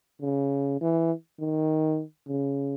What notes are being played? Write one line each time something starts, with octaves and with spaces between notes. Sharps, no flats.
C#3
E3
D#3
C#3